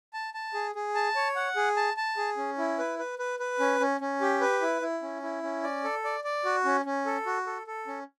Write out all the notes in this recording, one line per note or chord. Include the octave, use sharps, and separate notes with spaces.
A5
A5
G#4
G#4
A5
C#5
F#5
G#4
A5
A5
G#4
C#4
E4
B4
B4
B4
B4
C#4
C#4
C#4
G4
B4
E4
E4
C#4
E4
C#4
D5
A4
D5
D5
F#4
C#4
C#4
A4
F#4
A4
A4
C#4